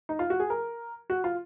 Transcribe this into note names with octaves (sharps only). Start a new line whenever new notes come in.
D#4
F4
F#4
G#4
A#4
F#4
F4